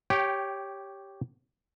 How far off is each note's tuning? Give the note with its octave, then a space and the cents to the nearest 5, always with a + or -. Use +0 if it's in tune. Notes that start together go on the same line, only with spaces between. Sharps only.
G4 +0 C#5 +0 G5 -25